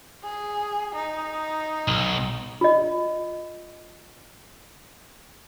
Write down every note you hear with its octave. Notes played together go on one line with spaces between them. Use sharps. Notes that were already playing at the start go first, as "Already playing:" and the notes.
G#4
D#4
B1
F4 D#5